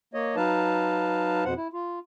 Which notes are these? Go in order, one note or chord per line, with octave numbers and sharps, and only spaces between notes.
A#3 C#5 D#5
F#3 D#4 B4 F5 A5
F2 B2 C5 F#5
E4
F4